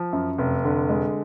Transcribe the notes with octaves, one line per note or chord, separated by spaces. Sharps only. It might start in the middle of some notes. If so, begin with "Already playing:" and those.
Already playing: F3
F#2
F1
D3
G#3